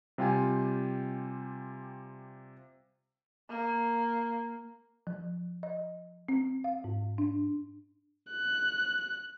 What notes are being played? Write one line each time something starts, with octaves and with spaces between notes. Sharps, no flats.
C3 G3 F4 G4 G5 G#5
A#3
F3
D#5
C4
F5
G#2
D4
F#6